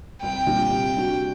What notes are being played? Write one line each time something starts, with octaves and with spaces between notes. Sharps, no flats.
C2 G5
A#2 G3 D4 G4
C3
G3 D4 F#4